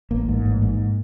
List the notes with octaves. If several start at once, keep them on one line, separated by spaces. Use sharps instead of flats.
A1 A#3
G#2
A1
G#2